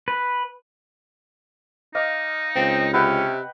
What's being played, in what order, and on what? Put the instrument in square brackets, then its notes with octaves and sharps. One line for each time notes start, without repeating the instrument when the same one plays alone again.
[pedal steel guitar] B4
[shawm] D#4 [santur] D#5 F5 D6
[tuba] C#2 [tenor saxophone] C4
[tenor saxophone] C3 [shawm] C#4 [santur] B4 F#5 G5